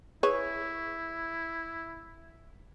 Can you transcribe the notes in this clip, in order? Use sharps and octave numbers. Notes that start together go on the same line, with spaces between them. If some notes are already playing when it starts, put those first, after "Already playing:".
E4 G#4 B4 C#5